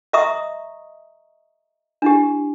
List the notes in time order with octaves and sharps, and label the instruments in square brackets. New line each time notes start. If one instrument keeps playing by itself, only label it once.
[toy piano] D#5 E5 A#5 C#6 D#6
D4 E4 G4